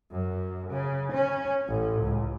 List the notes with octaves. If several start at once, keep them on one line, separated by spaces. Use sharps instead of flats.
F#2
C#3
C#4
A1
C#2